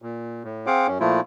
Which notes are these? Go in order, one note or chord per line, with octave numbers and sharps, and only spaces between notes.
A#2
A2
C4 G#4 C5 F5 F#5 D6
F#2 C#4
A#2 F3 A3 E4 F4